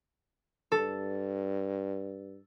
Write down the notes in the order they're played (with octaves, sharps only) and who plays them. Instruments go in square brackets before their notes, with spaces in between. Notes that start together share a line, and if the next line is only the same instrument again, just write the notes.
[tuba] G2 [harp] A4